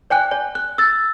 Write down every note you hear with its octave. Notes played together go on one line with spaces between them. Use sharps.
D5 G5 G#5 F#6
D5
F#6
E6 A6